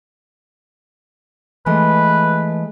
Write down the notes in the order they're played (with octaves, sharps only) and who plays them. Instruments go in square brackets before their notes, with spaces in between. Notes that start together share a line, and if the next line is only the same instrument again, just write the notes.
[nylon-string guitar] E3 G#3 A3 [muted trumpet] B4